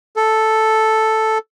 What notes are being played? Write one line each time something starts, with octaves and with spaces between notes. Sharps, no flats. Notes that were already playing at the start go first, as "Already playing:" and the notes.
A4